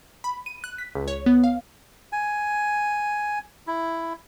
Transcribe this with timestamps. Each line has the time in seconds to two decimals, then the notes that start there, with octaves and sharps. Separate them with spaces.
0.24 B5
0.46 D#7
0.64 F#6
0.78 B6
0.95 C#2
1.08 C#5
1.26 B3
1.44 F5
2.12 G#5
3.67 E4